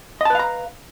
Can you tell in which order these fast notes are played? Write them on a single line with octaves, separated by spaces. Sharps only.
D#5 A5 B4 F5 A#5